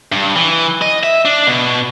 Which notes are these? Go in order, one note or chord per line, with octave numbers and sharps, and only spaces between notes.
G2
E3
D#5
E5
D4
B2